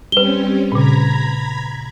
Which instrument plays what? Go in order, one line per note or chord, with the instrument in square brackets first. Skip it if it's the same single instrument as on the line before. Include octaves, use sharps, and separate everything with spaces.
[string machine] G3 C4 C#4 [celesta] B4 G7
[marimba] A#2 C#3 [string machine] A#5 B5 G#6